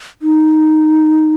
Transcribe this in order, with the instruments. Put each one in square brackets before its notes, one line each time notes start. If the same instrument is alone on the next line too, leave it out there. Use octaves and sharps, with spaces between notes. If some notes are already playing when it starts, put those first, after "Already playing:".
[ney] D#4